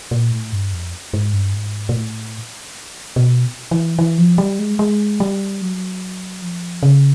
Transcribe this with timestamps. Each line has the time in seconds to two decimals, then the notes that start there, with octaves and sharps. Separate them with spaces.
0.11 A#2
0.31 A2
0.52 G2
0.72 F2
1.13 G#2
1.33 G2
1.53 G#2
1.89 A#2
1.95 A2
3.16 B2
3.71 E3
3.99 E3
4.18 F3
4.38 G3
4.59 G#3
4.79 G#3
5.20 G3
5.62 F#3
6.42 F3
6.83 C#3